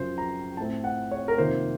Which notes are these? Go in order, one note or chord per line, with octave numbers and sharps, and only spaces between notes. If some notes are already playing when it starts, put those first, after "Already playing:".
Already playing: F#2 C#3 F3 C5
A#5
A2 A3 C4 A5
F#5
C#5
A#4
F2 C3 D#3 A#3 C5